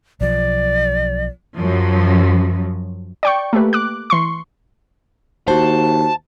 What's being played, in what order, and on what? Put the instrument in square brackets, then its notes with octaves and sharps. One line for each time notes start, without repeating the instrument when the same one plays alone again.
[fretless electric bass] B1 F3 [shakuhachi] D5
[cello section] F#2 F3 F#3
[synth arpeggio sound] D5 G5 C#6
A3 A#3 G4 B4
D6 F#6
E3 C6 C#6
[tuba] D#2 [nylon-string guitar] F#4 C5 [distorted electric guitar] A5